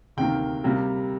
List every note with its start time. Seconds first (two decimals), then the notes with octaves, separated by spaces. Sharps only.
0.17 D2 C3 D#3 A#3 G5
0.64 C3 G3 A#3